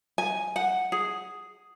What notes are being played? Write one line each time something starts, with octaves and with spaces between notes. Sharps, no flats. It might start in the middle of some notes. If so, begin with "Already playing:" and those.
G#5
F#5
G#4